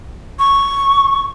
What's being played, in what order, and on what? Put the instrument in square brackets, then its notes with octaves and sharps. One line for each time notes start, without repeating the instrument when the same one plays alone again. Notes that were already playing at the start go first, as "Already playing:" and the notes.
[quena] C#6